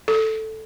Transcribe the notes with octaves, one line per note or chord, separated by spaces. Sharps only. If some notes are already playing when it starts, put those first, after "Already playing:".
A4